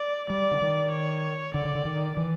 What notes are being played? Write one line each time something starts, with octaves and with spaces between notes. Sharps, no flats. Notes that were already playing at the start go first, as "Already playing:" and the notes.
Already playing: D5
G3 D5
D3
D#3
C#5
D3 D5
D3
D3
D#3
E3